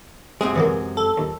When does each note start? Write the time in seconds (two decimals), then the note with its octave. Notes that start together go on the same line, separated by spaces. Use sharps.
0.41 F#2 C3 G#3 G#4
0.56 E3 F#3 A#3
0.97 A4
1.18 D#2